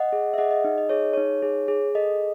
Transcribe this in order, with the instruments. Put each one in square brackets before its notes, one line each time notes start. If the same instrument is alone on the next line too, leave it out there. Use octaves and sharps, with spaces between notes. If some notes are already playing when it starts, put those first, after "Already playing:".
Already playing: [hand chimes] D#5 F#5
G#4
E5
G#4 D#5 F#5
D#5
D#4 D#5
D#5
G#4 C#5
D#4 C#5
G#4
G#4
A4 D#5